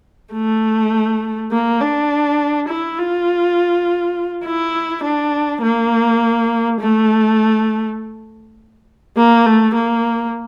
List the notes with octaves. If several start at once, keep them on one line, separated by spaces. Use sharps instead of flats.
A3
A#3
D4
E4
F4
E4
D4
A#3
A3
A#3
A3
A#3